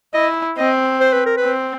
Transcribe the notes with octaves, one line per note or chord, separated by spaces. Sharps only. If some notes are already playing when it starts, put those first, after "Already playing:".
E4 D#5
C4 D#5
C5
B4
A#4
B4
C4